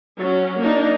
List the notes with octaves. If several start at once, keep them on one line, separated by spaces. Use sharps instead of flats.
F#3 C#4
A#3 D4 D#4